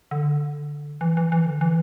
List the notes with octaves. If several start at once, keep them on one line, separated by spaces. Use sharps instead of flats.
D3
E3
E3
E3
D3
E3